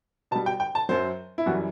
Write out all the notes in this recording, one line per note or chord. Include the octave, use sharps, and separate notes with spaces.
B2 G3 A5
G5
G5
A5
F#2 F#3 C5
E4
F#2 E3 G3 F#4